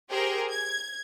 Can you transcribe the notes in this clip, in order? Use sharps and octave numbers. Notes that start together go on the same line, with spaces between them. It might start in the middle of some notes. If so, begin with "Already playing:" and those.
G4 G#4 A#4 C5 G5
G#6